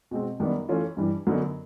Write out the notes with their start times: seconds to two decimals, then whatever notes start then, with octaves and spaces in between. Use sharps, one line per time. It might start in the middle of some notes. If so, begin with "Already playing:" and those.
0.11 B2 G#3 C4
0.40 F#2 D#3 G3 B3 D4
0.69 E3 A3 C#4 F4
0.97 G2 E3 G3
1.27 F#2 D3 F#3 B3 D#4